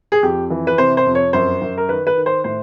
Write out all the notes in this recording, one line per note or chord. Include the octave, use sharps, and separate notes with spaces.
G#4
F2 G4
E3
B4
C3 C5
C5
F2
C#5
F#2 C5
F#2
A#4
D#3 B4
B4
D#3
C5
A2 C5